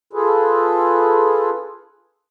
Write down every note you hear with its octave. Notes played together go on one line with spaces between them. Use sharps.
F4 G#4 A4 B4